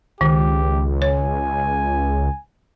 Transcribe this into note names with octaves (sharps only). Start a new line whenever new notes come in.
C#2 D#3 G4
C#5 G#5